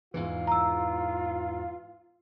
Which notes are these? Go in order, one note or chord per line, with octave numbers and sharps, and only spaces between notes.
E2 G#2 E3 F4
A#5 E6